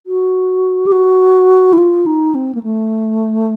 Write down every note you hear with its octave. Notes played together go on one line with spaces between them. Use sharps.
F#4
G4
F#4
E4
F4
D#4
C4
A#3
A3